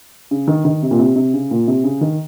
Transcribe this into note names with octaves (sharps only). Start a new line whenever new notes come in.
C#3
D#3
D#3
C3
A#2
C3
C3
C#3
A#2
C3
C#3
D#3